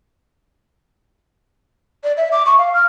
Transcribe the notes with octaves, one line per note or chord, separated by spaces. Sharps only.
D5
E5
D6
C#6
F5
F6